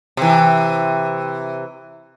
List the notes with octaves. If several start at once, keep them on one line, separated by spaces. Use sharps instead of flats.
C3 E3